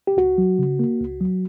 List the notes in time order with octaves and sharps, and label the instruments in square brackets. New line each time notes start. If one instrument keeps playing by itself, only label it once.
[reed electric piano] G4
C#2 F#4
F#3
C#3
A#3
C#2
F#3